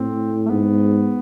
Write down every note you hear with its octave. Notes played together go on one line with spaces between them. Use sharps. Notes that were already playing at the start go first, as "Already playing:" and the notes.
Already playing: A2 C4
A3
G#2 B3